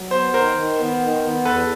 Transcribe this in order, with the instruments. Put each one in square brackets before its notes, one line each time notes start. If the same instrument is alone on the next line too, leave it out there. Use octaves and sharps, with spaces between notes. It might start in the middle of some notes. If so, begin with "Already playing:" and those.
Already playing: [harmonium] F#3
[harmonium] B3 [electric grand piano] C5
[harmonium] D#3 [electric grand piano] A#4 C5
[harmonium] D#3
B3
D#3
B3
[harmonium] E2 [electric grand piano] A4 B4